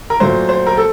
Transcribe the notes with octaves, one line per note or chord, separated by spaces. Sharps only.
A#4
A#2 F#3 A3 C5
C5
A#4
A4